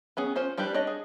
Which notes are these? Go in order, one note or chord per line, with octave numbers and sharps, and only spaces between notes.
B3 C#4 G#4
C#4 F4 C5
G3 D4 E4 G4 B4
D4 C#5 D#5
G#4